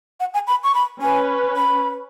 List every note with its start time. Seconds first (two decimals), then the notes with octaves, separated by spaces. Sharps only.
0.20 F#5
0.34 G#5
0.47 B5
0.63 C#6
0.75 B5
1.02 C#4 B4 G#5
1.57 B5